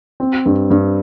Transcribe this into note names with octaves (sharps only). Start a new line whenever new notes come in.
C4
G2
G2